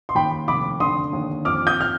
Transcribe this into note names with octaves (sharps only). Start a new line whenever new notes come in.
C6
D#2 G5 B5
F1 B5 D6
D3 C6 D#6
D#2
F2 D6 F6
D#6 G6
F6